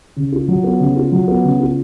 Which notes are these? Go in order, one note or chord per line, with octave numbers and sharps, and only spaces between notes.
C#3
F4
F#3
B3
C#3
F4
F#3
B3
C#3
F4